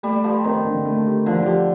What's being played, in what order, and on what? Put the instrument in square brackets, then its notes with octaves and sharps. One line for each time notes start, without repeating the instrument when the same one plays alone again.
[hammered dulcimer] G3 [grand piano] A3
[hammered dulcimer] F3 [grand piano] G4
[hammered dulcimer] D#3 [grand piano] C4
[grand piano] D3
A3
G4
[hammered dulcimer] D3 [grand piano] F3
[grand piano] G4